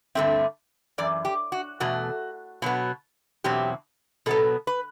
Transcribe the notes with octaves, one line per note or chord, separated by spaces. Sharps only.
G2 D3 A3 C4 E5
F#2 E3 D5
G4
F#4
E2 B2 A3 F#4
B2 F#3 B3
E2 B2 F#3 C4 G4
B2 F#3 B3 A4
B4